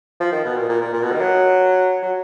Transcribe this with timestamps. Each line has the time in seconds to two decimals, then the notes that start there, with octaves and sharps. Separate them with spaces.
0.20 F3
0.32 D#3
0.45 B2
0.56 A#2
0.69 A#2
0.81 A#2
0.94 A#2
1.03 B2
1.12 D#3
1.21 F#3
2.03 F#3